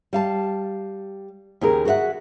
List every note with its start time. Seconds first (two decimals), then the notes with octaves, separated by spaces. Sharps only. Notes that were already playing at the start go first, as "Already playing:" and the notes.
0.13 G3 F5 A5
1.61 D#2 C#3 G4 G#4 A#4
1.85 F#4 G#4 C5 E5 F#5